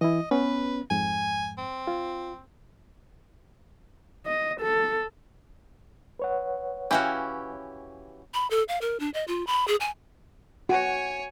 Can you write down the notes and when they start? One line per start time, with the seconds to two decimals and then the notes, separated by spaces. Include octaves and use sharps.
0.01 E3 E4 D#5
0.31 B3 C#4 B4
0.91 F2 G#2 G#5
1.58 C4
1.87 F4
4.26 D#5
4.61 A4
6.19 B4 C#5 F#5
6.91 E3 C#4 E4 F#4 G4 F5
8.34 B5
8.50 A4
8.68 F5
8.81 A#4
9.00 D4
9.14 D#5
9.28 F4
9.47 B5
9.68 G#4
9.80 G#5
10.69 F#4 C#5 G#5